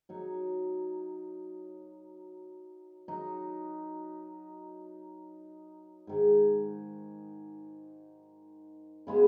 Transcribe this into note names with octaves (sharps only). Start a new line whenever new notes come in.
F#3 D#4 F#4 C#5
F#3 D#4 F#4
G#2 D#3 G#3
C#3 G#3 B3 F#4